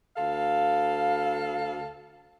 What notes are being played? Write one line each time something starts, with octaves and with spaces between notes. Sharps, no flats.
D2 A4 F5